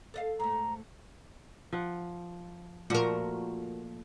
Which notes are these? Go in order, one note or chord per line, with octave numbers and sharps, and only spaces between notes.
A4 D#5 F5
G#2 A3 A#5
F3 F#5
A#2 F3 A3 F#4 A#4